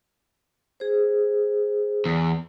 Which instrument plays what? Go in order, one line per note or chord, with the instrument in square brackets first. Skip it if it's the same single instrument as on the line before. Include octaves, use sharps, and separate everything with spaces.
[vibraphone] G#4 C5
[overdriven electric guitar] E2